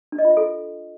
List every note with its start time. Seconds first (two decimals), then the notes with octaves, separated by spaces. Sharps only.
0.12 D4
0.18 D#5
0.25 F4
0.31 E5
0.37 A4